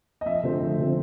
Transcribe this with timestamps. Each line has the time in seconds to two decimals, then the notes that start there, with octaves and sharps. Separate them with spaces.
0.21 D#5
0.26 F2 E5
0.43 D3 F3 A3 C4
0.61 F2
0.79 D3 F3 A3 C4